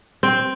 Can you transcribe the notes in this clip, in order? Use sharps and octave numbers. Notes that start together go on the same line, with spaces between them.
C4